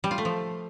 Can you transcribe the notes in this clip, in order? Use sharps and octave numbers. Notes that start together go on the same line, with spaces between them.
G3
F4
A3
F3